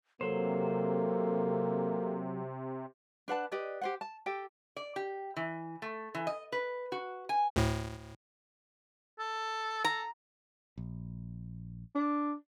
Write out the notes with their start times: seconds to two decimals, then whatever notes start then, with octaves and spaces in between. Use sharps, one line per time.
0.21 C3 F#3 A#3 A4 C5
3.28 D4 B4 F#5 A5
3.52 G4 B4 D5 D#5
3.81 G4 C5 F#5
4.01 A5
4.26 G4 A4 G5
4.76 D5
4.96 G4
5.36 E3
5.82 A3
6.15 E3
6.27 D#5
6.52 B4
6.92 F#4
7.29 G#5
7.56 D2 A2
9.19 A4
9.85 A4 A#5
10.78 A#1
11.95 D4